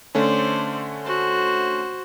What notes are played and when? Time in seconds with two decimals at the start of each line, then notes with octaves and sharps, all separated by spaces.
0.15 D3 A3 C#4 C5 D5
1.03 F#4 C5